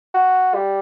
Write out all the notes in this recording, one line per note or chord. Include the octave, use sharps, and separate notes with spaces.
F#4
G3